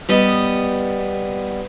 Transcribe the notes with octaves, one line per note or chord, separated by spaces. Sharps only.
G3 B3 D#5